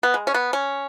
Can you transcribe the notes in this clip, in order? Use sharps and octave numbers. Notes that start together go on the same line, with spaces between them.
B3
G#3
C#4
B3
C#4